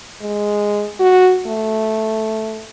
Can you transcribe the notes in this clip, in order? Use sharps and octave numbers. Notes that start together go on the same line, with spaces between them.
G#3
F#4
A3